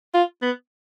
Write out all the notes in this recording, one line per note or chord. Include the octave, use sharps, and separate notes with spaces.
F4
B3